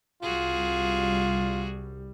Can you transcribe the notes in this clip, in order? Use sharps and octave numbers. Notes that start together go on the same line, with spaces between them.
C2 G3 F4 F#4 G#4